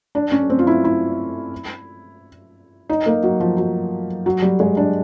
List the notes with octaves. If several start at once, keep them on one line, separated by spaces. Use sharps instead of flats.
D4
C#4
C4
F4
E4
E4
D#4
A#3
F#3
F3
F#3
F#3
G3
G#3
D4